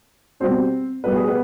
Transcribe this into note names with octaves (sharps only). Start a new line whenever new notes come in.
B2 G3 C4 C5
B2 G3 B4
G#4
B3 B4